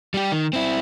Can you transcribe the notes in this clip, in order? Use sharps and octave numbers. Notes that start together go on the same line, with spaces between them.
G3 G4
D#3
C4 E4